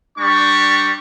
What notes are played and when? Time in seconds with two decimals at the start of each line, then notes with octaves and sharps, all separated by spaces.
0.17 G3 D4 C#6